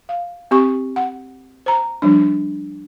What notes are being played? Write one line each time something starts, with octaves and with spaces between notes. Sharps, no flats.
F5
C4 G4 C#6
F#5
C5 A#5
F3 G3 D4